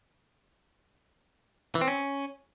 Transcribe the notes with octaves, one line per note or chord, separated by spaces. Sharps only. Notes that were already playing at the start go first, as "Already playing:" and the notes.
E3
C4
C#4